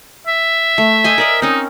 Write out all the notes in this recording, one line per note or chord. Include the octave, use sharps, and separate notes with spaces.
E5
A3
C5 D#5 G#5
A#4 D5 D#5
C4 C#4 D#4